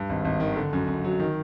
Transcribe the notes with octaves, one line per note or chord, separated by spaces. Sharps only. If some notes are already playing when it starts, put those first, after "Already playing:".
Already playing: G2
G#1
G#1
D#3
D3
F#2
F#2
F#3
D#3